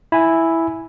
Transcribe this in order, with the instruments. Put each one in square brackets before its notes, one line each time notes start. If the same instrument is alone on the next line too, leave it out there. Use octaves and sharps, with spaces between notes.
[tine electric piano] E4 G#5